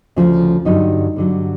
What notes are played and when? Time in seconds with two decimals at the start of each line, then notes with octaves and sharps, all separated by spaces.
0.16 D2 C#3 F3
0.65 G2 D3 F#3 D#4
1.16 G2 D3 F#3